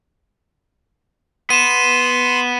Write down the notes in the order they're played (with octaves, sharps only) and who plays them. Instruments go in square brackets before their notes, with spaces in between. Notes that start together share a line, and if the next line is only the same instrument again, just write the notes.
[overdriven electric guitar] B3 [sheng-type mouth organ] C6 [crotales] D#7 E7